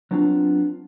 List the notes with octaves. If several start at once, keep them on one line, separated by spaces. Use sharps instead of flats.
F#3 B3 C4 D4 F4